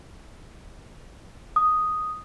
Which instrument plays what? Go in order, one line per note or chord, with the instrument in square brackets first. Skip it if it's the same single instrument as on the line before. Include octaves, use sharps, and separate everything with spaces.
[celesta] D#6